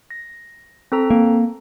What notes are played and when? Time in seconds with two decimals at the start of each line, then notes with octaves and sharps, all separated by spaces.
0.11 A#6
0.92 C4 A4 A#5
1.10 A#3